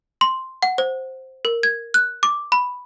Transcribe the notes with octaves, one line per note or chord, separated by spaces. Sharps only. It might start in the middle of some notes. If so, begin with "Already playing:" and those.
C6
F#5
C5
A#4
G#6
F#6
D6
B5